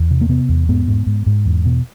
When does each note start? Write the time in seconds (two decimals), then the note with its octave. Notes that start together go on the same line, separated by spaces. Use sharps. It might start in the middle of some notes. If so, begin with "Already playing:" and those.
Already playing: E2
0.11 C3
0.21 A#3
0.29 C3 B3
0.49 E2
0.69 G#2 B3
0.87 G#2
1.07 G#2
1.26 G#2
1.46 E2
1.65 B2